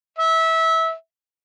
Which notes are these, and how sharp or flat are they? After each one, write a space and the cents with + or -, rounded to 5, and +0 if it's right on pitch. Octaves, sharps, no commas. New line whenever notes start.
E5 -20